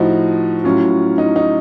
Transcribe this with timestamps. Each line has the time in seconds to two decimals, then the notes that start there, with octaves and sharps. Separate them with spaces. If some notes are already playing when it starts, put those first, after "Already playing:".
Already playing: A2 F3 D#4 F#4
0.64 A2 F#3 C#4 F4
1.18 D#4
1.36 D#4